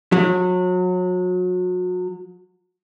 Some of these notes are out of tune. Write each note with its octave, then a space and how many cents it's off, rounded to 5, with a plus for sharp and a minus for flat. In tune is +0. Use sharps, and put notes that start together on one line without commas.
F#3 -30